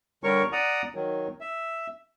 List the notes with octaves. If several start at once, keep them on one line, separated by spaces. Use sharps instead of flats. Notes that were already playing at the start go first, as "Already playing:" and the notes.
D3 G3 A#4 C#5 C#6
D5 F#5 A#5 D#6
D#3 F#3
E5